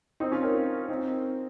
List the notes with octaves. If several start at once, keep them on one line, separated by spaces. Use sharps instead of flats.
C4 D#4
C#4 F4
A#4 C#5
C4 D#4